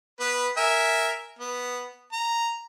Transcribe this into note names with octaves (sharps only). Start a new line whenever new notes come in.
B3 B4
A#4 E5 G#5
B3
A#5